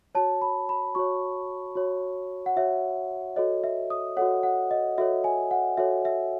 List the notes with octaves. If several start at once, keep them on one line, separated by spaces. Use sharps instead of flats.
F#4 C#5 A5
B5
B5
F#4 C#5 C#6
F#4 C#5
F#5
F#4 C#5 E5
F#4 A4 C#5 D#5
E5
D#6
F#4 A4 C#5 F#5
F#5
D#5
F#4 A4 C#5 E5
G#5
F#5
F#4 A4 C#5 E5
E5